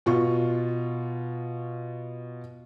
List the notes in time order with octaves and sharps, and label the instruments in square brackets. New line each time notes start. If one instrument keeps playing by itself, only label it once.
[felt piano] B2 F4 C#6